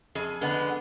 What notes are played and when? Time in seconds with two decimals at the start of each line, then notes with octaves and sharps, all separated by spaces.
0.15 F2 G#4
0.41 D3 G#3 B3